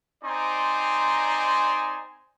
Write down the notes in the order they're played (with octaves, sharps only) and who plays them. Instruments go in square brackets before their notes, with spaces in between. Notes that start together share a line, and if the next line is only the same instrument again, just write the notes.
[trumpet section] C4 D#4 D5 G#5 A#5 C6